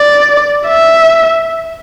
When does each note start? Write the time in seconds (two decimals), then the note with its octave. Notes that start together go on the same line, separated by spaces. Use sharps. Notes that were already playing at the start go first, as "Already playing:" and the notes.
Already playing: D5
0.67 E5